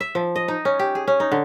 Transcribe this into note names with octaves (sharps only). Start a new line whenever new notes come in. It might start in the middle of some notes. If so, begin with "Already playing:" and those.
E5
F3
D#5
D#4
C#4
G4
G#4
C#4
D#4
D3